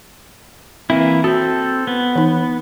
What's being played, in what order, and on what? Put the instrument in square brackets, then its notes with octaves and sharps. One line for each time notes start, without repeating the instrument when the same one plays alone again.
[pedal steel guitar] E3 A#3 E4 [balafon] C4
[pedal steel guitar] C4 A4 [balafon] F#4
[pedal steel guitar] B3
[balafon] E3 D#4